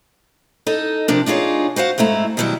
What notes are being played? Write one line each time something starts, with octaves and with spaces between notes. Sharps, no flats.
D#4 A4 D#5
C3 F3 D4 A#4
D4 D#4 F4 G#4 C#5
F#4 C5 F5 F#5
G#2 A3 E4 A#5
B2 D#3 F#3 G3 E4